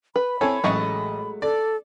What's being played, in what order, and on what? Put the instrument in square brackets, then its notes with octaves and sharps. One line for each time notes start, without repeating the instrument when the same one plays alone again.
[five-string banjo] B4 [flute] B5
[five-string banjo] C4 E4 [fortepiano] A4 C#5 G#5
[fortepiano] A1 D#5 C#6 [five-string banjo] F#3 G#3 A3
[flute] A4 [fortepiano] D5